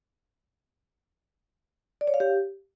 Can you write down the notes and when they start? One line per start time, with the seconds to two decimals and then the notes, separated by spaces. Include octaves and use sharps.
2.01 D5
2.07 C#5
2.14 F5
2.20 G4